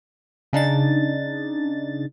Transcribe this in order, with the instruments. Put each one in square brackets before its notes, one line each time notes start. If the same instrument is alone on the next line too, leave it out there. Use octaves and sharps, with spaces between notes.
[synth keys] C#3 D4 D#4 A6